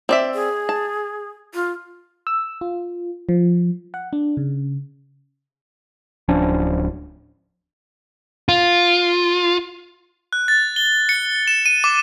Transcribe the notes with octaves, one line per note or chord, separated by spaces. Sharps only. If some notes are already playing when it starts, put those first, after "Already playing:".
C4 D5 E5
G#4
A5
F4
E6
F4
F3
F#5
D4
C#3
D1 F3 C#4 D4
F4
F#6
A6
G7
C#7
E7
D#7
D6